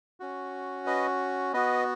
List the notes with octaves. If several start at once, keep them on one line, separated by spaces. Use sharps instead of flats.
C#4 F#4
B4 D#5
B3 F#4 B4 D#5